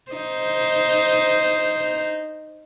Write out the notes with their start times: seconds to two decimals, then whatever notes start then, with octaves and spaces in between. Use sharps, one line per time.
0.12 D#4 C5